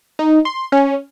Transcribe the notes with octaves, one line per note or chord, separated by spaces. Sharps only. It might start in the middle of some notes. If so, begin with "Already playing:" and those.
D#4
C6
C#4